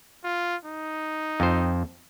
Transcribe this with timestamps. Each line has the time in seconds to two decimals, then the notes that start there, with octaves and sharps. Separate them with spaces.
0.24 F4
0.65 D#4
1.40 F2 C5